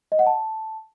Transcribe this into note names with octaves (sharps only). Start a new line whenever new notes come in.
D#5
F#5
A5